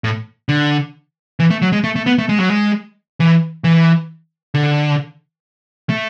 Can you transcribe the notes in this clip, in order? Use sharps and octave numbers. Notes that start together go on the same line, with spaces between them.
A2
D3
E3
A3
F#3
G#3
A3
A3
B3
A3
G#3
F#3
G#3
E3
E3
D3
A3